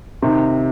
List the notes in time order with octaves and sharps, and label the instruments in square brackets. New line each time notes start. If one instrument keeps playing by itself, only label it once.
[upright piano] C3 D#3